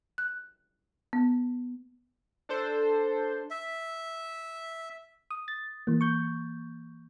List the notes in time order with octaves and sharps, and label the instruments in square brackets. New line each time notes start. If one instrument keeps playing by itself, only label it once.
[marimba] F#6
B3
[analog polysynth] D4 A4 C5
[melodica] E5
[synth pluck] D#6
A6
E3 A#3
C#6 G6